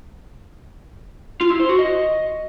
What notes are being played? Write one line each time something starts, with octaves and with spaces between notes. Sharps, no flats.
F4
E4
C5
F#4
D#5